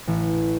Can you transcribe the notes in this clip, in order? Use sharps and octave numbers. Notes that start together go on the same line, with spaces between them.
A1